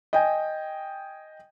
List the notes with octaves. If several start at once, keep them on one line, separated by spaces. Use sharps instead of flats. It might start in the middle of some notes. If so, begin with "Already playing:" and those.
D#5 G5 G#5